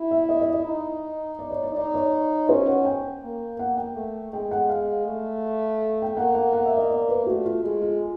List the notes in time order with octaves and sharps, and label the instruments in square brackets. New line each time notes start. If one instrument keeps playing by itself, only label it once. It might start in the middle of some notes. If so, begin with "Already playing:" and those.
Already playing: [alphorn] E4
[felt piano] E5
D#5
D#5
D#5
[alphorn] D#4
[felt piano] D5
C#5
D5
[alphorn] D#4 [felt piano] D5
[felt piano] C#5
[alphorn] C#4 [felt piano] C5
[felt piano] F#5
G5
[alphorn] A#3
[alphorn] A#3 [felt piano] F#5
[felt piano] G5
[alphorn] A3
[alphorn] G#3 [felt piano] G5
[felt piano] F#5
F5
[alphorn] A3
[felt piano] G5
[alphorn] A#3 [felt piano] F#5
[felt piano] F#5
F#5
E5
D#5
D5
B4
[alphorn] A3 [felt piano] F#4
[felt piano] F4
[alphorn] G#3
[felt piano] F4